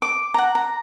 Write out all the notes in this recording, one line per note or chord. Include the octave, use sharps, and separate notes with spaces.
D6
F#5 A#5
A#5